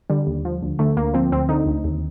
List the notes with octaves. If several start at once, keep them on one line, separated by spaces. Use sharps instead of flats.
D3 G3
D#2
F3
D2
D3 A3
D2 A#3
F3 C4
D2 C4
D3 D#4
D2
D#2